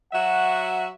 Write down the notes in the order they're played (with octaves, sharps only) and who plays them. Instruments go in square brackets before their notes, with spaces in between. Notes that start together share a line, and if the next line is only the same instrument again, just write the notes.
[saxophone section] F#3 F#4 E5 [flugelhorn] F#5